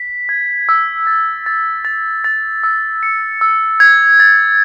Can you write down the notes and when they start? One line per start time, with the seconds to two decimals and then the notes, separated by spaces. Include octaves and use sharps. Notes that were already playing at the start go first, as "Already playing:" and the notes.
Already playing: B6
0.29 G#6
0.69 E6
1.07 A6
1.46 A6
1.85 A6
2.24 A6
2.63 E6
3.03 C#7
3.41 E6
3.80 G#6
4.20 A6